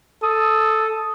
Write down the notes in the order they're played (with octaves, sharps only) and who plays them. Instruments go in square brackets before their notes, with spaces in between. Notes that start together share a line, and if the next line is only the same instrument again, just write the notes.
[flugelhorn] A4 [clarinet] D#6